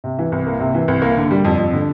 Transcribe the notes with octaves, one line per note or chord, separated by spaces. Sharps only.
C3
E3
C2
A#3
C3
E3
C2
A#3
D3
G3
F2
F2
D3